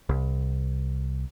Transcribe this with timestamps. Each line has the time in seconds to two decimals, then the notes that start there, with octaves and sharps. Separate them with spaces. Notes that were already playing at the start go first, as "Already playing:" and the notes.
0.09 C2